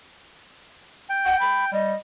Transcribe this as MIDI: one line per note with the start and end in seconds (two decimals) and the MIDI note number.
1.10 1.69 79
1.26 1.36 78
1.40 1.65 83
1.73 1.93 55
1.73 1.96 75